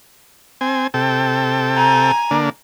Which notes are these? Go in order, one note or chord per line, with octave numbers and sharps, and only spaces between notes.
C4 G#5
C3 A4 G5
G#5 A#5
D3 A#3 D4